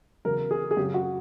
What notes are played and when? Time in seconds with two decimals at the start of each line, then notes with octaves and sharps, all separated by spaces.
0.25 E2 C#3 F#3 A#4
0.51 G#4
0.71 G#4
0.77 F#2 C#3 F#3 G4
0.94 F#4